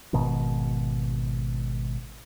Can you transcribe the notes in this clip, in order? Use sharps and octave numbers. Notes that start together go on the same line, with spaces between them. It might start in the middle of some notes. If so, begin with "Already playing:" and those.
G#1 G#2 B2 D#3